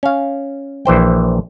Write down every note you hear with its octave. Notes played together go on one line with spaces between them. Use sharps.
C#4 F5
A#1 E3 C5 G5